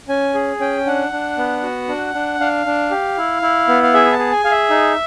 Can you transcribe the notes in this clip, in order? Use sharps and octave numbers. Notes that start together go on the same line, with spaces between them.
C#4 G#5
G#4
C#4 G5
D4 F#5
D4
B3
F#4
D4
D4
D4 F5
D4
G4
E4
E4
B3
F5
G#4 E5
A5
G#4
G#5
G#4 F5
E5
D#4